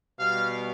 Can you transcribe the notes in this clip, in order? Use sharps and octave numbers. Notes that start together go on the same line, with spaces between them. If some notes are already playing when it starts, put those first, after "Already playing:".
B2 G3 F5